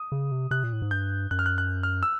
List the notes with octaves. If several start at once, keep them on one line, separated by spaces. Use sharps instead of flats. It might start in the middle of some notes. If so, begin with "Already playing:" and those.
Already playing: D#6
C#3
C3
C3 F#6
A#2
A2
G#2
G2 G6
F#2 F#6
F6
F#6
F#6
F6
E6